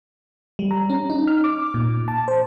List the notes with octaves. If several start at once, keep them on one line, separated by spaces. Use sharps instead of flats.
G3
A#5
C#4
D#4
F6
D6
A#2
A5
C5